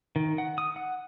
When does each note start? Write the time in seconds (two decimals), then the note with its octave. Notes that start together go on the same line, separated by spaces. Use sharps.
0.16 D#3
0.38 F#5
0.58 D#6
0.76 F#5